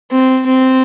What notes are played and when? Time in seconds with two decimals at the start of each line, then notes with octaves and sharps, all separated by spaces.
0.11 C4
0.46 C4